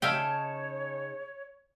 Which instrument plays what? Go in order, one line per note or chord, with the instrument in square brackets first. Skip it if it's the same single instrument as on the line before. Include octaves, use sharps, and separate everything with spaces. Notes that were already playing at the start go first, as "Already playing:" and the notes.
[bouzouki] C#3 D#4 A5 [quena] C#5 [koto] E5 F5 G5